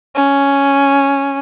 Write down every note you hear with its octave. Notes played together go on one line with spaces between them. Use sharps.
C#4